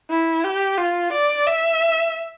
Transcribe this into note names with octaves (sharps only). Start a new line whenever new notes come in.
E4
G4
F4
D5
E5